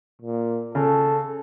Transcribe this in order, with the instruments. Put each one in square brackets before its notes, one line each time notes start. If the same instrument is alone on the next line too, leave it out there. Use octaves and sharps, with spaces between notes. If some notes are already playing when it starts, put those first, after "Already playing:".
[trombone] A#2
[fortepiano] C#3 [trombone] A4